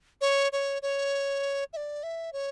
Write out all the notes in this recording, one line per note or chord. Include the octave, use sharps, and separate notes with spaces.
C#5
C#5
C#5
E5
D5
E5
C#5